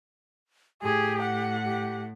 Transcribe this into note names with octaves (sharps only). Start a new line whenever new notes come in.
A2 G4 G#4
F#5
G4